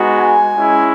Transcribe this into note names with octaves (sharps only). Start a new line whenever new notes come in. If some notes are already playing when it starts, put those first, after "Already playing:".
Already playing: G#3 B3 D#4 F#4
G#5
G#3 C#4 E4